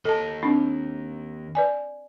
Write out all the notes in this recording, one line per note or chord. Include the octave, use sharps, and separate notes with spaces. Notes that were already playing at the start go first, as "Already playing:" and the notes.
D#2 A4 D#5 A5
C4 D4 D#4
B4 D5 G#5